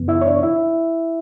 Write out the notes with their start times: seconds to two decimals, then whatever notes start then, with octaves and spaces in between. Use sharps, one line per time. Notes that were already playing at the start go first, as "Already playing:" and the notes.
Already playing: F#2 C#3 E3 B3
0.08 E4 E5
0.21 C#5
0.25 D4 D5
0.43 E4 E5